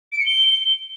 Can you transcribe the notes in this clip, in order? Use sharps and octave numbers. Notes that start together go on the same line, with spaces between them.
D7
C#7
G7